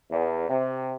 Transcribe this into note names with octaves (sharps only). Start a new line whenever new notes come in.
E2
C3